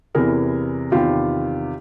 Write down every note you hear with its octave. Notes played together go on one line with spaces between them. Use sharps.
E2 C3 E3 G#4 A#4
E2 C3 D#3 F4 G4